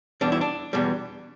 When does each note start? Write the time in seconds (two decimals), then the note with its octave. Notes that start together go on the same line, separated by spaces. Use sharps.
0.21 E2 B2 G3 D4
0.32 E4
0.41 D4
0.73 E2 B2 G3